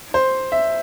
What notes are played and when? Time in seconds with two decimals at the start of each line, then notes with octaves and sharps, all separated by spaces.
0.14 C5
0.52 E5